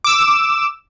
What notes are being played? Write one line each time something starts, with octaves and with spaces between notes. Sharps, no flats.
D6 E6 E7